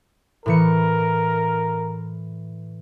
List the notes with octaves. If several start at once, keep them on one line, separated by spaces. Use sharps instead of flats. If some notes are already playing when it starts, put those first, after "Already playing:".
A2 E3 A#4 C#7